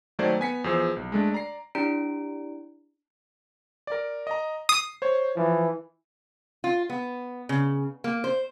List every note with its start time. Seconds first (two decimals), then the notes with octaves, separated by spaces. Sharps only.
0.19 D#3 F#3 A3 C5 D5 G#6
0.40 B3 G#5 B6 C#7
0.64 E2 F3 G#4 C5 E6
0.96 B1
1.12 G#3 A3 D4
1.32 D5 A#5 C7
1.75 D4 E4 G4 D5 A#5 D7
3.87 A#4 D5
4.27 D#5 A#5
4.69 D#6 C7
5.02 C5 C#5
5.37 E3 F3
6.64 F4
6.90 B3
7.49 C#3
8.04 A#3
8.24 C5